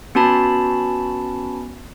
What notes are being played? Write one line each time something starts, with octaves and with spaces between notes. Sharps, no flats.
B3 C#4 F#4 A5 B5